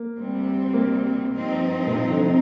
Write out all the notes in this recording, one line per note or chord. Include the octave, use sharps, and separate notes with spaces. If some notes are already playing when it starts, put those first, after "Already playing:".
Already playing: A#3
D2 C3 G3 C4
A#3
G2 F3 C4 D#4
A#2
C3
D3
C3